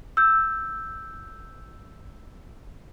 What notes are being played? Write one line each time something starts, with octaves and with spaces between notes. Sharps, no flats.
E6 G6